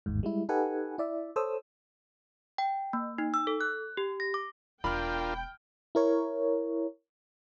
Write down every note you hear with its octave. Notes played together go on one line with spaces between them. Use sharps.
G1 D#2 G#2
G3 G#3 E4
D#4 G4 A4 B4 F#5 G#5
E4 D5 E5
A4 C5 C#5 D#6 E6
G5
A#3
D#4
E6
A4
F#6
G4
A#6
D6
E1 D4 F4 A#4 G5 B5 F6
E4 A#4 C#5